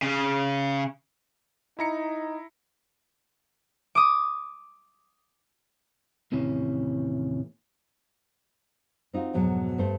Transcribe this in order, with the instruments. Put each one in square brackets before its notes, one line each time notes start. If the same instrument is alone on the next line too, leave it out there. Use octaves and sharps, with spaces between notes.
[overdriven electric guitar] C#3
[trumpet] D#4 [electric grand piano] E4 A#5 C#7
[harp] D6 D#6
[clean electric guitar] D#2 A2 C3 E3 C#4
[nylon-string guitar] C4 D#4 F4 F#4
F2 G#2 B2 F#3
G2 A3 C5